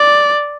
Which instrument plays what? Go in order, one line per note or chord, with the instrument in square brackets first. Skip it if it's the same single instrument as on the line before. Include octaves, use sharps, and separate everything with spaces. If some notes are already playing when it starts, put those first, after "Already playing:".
Already playing: [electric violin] D5